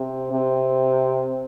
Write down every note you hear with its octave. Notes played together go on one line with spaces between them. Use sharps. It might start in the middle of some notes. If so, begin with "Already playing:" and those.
Already playing: C3
C3